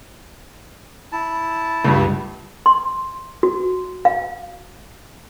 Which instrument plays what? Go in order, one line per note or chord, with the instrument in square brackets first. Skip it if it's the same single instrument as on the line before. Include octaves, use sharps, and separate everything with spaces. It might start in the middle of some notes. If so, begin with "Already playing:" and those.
[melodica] E4 A5
[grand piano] C#2 G2
[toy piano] C6
F#4
F5